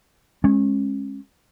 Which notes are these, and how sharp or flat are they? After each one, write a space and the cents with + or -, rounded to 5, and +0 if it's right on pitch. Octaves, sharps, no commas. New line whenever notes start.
G#3 +0 C#4 -30